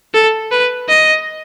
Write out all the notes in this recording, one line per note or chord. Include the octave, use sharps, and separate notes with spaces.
A4
B4
D#5